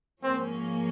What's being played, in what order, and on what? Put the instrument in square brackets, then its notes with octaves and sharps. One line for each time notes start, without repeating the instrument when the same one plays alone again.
[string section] G#2 F3 A#3 C#4 [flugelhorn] C4